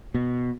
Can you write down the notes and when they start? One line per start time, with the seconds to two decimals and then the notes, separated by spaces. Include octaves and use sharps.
0.14 B2